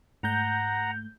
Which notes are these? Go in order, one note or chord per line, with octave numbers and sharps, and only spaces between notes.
G#2 A3 F#5 A#5 G6